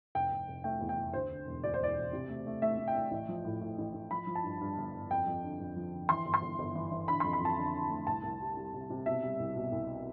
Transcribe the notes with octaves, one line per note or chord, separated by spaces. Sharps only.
F1 G5
F1
F1
A3 G5
E2
G5
F1
D2 C5
D3
E1
D2 D5
C5
E1 D5
E1
C3
A3
A3
A3 E5
A3
G5
A3
A1
F3
A2
A2
A1
A1
F3 B5
F3
A5
G2
G2
G1
G1
F2 G5
F2
D3
F2
F3
D3
E3 C6
G1
C6
G1
G1
E3
E3
D3 B5
F2 C6
B5
F2 A5
D3
D3
A3
C2 A5
C2
G3
G3
C3
C3
B2 E5
G3
C2
B2
C2